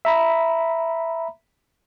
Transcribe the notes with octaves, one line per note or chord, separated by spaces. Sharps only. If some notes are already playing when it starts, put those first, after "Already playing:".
E5 A#5 B5